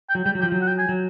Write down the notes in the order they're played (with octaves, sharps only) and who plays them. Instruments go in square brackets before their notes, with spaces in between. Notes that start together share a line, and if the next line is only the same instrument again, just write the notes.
[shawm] G5
[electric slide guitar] F#3
[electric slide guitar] G3 [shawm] G5
[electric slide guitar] F#3
[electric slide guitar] F3 [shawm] G5
[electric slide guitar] F#3
[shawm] F#5
G5
G#5
[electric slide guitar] F#3